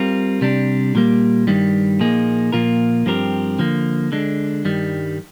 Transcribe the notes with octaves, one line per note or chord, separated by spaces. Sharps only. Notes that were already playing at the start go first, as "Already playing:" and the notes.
Already playing: G3 C4 F4 A#4
C3 G3 D4
A#2 G3 A#3
G2 D#3 G3
A#2 F3 A#3 D#4 G#4
A#2 F3 A#3 F4 A#4
G2 F3 C4 G4 A#4
D3 F3 A#3
D3 G#3 D4
G2 D#3 G3